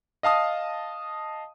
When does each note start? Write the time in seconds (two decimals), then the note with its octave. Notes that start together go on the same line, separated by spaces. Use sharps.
0.23 D#5 F5 A5 D#6